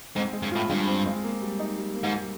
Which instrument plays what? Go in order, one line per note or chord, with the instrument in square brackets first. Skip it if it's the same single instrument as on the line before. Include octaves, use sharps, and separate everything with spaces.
[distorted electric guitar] G#2 [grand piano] C4
[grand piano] G#3
[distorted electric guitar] G2
[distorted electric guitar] A2 [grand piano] F4
[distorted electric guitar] G2 [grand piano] G#3
[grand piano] C4
G#3
A#3
G3
D#4
G3
A#3
[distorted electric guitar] G#2
[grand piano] G3